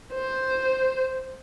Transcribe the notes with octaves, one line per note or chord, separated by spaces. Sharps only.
C5